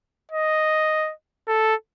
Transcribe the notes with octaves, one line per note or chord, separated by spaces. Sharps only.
D#5
A4